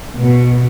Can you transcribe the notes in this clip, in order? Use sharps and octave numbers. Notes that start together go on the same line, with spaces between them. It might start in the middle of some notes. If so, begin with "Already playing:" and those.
B2